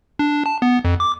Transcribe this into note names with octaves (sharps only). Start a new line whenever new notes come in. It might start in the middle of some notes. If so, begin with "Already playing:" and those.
D4
A5
B3
F2
D6